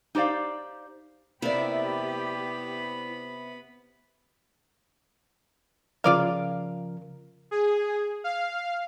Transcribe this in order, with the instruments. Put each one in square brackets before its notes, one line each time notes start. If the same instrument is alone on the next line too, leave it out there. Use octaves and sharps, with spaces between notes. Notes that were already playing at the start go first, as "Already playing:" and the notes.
[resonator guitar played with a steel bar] D#4 G4 C5 D5 F5
[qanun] C3 A#3 [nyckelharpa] B3 B5 [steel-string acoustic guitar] E4 D5 [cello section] G4
[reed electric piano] C#3 F3 A#4 [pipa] F4 D5 F5
[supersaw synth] G#4
F5